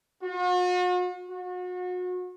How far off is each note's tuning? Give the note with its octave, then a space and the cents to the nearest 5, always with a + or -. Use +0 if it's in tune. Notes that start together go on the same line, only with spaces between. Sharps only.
F#4 -45
F#4 -35